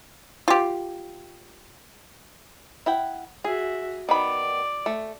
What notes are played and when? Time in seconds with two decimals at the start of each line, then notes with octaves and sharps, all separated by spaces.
0.48 F4 G4
2.86 E4 F#5 G5
3.44 F#4 G#4 E5
4.09 D#3 B3 D5 B5
4.86 A3